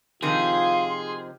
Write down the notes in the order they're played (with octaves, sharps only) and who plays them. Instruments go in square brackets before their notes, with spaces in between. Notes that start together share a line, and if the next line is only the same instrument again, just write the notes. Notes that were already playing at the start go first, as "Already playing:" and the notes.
[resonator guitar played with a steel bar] C3 D#3 F3 [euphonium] F4 [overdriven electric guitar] G#4 [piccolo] C6